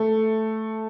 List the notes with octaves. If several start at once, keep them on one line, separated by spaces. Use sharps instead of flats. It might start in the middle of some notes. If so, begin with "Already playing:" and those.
Already playing: A3